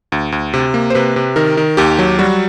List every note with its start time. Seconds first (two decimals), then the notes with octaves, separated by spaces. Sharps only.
0.12 D2
0.32 D2
0.54 C3
0.74 A#3
0.90 C5
0.95 C3 B4
1.16 C3
1.36 D#3 A#4
1.57 D#3
1.77 D#2 G4
1.99 F#3
2.19 G3 F#4